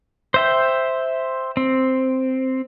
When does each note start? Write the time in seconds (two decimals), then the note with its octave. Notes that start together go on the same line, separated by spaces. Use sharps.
0.34 C5 E5 G5
1.57 C4